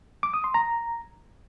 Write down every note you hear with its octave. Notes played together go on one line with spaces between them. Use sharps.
D6
D#6
C6
A#5